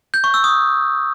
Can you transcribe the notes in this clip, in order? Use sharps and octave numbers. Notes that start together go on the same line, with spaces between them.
G6
C#6
E6
D#6